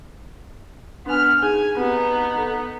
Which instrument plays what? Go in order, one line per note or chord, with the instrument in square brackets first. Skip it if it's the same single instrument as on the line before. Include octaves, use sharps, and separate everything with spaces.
[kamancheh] B3 F6 [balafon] D4 G#5
[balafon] D#4 G#4 [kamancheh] G#5
[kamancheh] B3 D#4 [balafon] C4 G4
[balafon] A4